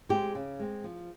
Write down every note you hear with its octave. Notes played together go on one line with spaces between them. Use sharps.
G#3 C4 G4
C#3
G#3 C4
F3